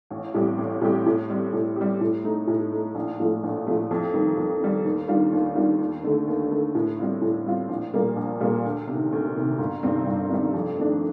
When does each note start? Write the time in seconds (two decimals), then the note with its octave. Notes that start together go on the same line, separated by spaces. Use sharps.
0.11 A1
0.34 A2 G3 C4 G4
0.58 A1
0.81 A2 G3 C4 G4
1.06 A2
1.29 G3 C4 G4
1.53 A2
1.76 G3 C4 G4
2.01 A2
2.24 A3 D#4
2.48 A2
2.72 A3 D#4
2.95 A#1
3.20 A2 F3 A3
3.43 A#1
3.66 A2 F3 A3
3.91 F2
4.14 D#3 G3
4.37 F2
4.61 D#3 G3
4.85 D#2
5.08 D#3 G3 D4 F4
5.32 D#2
5.56 D#3 G3 D4 F4
5.80 D#2
6.04 D3 A3
6.28 D#2
6.51 D3 A3
6.75 A2
6.99 G3 C4 F4
7.22 A2
7.46 G3 C4 F4
7.69 A#1
7.94 A#2 G3 A#3
8.16 A#1
8.40 A#2 G3 A#3
8.65 D2
8.87 C3
8.93 D#3
9.12 D2
9.35 C3 D#3
9.58 G1
9.83 G2 D#3 G3 C4
10.07 G1
10.30 G2 D#3 G3 C4
10.54 F2
10.78 D#3 A3 D4